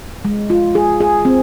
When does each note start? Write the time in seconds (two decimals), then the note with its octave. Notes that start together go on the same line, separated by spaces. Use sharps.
0.25 G#3
0.50 F4
0.75 G#4
1.01 G#4
1.25 C4